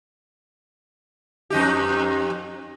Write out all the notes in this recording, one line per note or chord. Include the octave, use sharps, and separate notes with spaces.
F2 D#4 G4